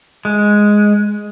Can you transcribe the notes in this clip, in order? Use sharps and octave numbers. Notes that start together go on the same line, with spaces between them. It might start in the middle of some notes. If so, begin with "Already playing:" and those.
G#3